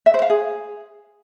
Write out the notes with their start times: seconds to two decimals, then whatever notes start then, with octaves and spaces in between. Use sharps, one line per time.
0.06 E5
0.14 C5
0.22 F5
0.30 G#4